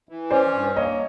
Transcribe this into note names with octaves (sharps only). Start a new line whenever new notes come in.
E3
C#4 C5 D5
G2
A#3 C#5 D#5